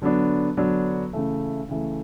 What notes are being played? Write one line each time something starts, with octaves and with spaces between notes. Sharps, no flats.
D3 F#3 B3 D4
D3 F#3 B3 D4
C#3 E3 A3
C#3 E3 A3